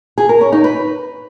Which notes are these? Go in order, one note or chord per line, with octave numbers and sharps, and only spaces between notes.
G#4
A#4
C#4
D#4
B4